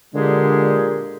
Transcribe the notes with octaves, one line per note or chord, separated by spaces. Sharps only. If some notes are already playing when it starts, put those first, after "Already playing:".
A#2 D3 G#3 G4 G#4